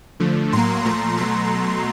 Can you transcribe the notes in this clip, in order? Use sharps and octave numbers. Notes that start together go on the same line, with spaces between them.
D3 F3 A3
A2 F#3 A#3 A#5 C6
A#2 F3 A3 A#5 C6
B2 F#3 A3 A#5 C6